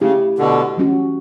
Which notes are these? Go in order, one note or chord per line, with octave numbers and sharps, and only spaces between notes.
C#3 A3 E4 G4
B2 D3
E3 G3 C#4 F#4